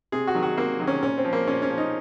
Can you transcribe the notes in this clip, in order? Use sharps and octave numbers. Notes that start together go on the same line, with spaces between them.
C3 G#4
F#4
D#3 F#3
F#4
C3 A#3
D#3 F#3
C#4
A#2 C#4
C4
F3
A#3
A#2 C#4
C#4
F3
D#4